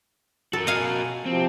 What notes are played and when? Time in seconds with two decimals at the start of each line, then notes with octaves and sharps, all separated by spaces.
0.53 F#4 A4 A#4
0.67 B2 D#5 F5 G#5
1.26 C3 F3 C4